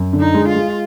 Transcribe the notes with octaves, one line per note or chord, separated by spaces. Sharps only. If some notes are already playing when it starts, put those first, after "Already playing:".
Already playing: F#2
D3
D#4
G#3
F4
G#3